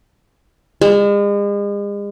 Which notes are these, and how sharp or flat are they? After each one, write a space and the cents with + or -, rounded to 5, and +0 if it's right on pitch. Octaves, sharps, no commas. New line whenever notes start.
G#3 -40